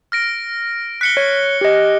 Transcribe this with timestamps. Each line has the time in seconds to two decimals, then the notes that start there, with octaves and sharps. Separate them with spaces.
0.12 F6 A#6 D7
1.01 F#6 B6 C#7 G7
1.17 C#5
1.61 G4 D#5